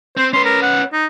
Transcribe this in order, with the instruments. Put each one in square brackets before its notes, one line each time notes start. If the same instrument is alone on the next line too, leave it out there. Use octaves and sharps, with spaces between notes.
[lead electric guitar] C4 [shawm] C5
[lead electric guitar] C#4 B4 [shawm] C6
[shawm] A#4
F#5
D#4